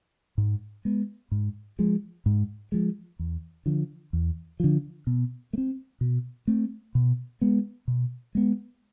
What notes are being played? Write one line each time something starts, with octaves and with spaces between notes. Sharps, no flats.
G#2
G#3 B3
G#2
F3 G#3
G#2
F3 G#3
E2
D3 F3
E2
D3 F3
B2
A3
C4
B2
A3 C4
B2
G#3 B3
B2
G#3 B3